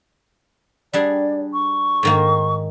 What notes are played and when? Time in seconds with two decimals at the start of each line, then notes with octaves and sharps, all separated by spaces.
0.93 G3 D4 G#4 D5
1.54 C#6
2.03 G#2 D#3 A#3